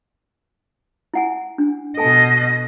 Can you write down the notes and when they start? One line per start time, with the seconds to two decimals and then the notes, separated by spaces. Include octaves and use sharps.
1.14 E4 F#5 G#5
1.58 D4
1.97 B2 A4 D#5 G#5 A5